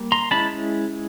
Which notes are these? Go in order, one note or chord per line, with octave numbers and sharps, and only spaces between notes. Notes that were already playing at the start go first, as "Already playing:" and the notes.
Already playing: G3 A#3
A#5 C6
G#3 C#4 E4 A5 B5